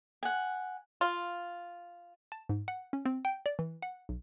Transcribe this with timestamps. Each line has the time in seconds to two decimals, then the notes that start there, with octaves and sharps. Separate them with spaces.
0.23 F#5 G#5
1.01 F4
2.32 A5
2.49 G#2
2.68 F#5
2.93 C#4
3.06 C4
3.25 G5
3.46 D5
3.59 E3
3.82 F#5
4.09 B1